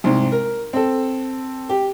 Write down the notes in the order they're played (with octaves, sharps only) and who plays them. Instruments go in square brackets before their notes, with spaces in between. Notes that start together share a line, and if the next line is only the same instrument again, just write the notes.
[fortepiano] C2 G#2
A#4
C4 A4
G4